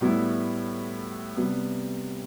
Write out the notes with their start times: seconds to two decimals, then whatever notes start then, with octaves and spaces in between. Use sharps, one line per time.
0.01 A2 G3 B3 E4
1.36 C3 G3 B3